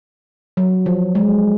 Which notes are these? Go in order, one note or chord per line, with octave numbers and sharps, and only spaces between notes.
F#3
F3
G#3